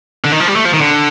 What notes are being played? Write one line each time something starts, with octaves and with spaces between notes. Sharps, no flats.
D3
D#3
F3
G3
A3
F3
D#3
D3